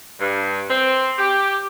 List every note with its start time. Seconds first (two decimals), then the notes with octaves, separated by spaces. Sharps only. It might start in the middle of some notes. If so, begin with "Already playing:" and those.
0.20 G2
0.69 C4
1.19 G4